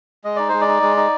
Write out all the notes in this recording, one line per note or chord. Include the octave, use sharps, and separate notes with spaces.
G#3 D#5
D#4 D5
G#3 C5
D5
D#4
G#3
D#4